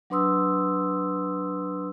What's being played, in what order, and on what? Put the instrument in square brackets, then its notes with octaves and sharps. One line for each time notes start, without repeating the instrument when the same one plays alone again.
[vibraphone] F#3 D4 B4 C6 D#6 E6